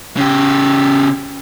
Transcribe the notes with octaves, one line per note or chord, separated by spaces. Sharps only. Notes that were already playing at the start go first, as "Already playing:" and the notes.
C#3 G4